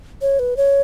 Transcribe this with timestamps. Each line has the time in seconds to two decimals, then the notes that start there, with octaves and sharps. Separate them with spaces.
0.22 C#5
0.39 B4
0.57 C#5